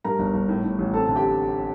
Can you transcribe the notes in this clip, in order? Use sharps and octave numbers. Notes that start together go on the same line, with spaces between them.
G2 A#4 A#5
G1
G1
A2
A2
A1
C4 A4 A5
D3 A5
G4 G5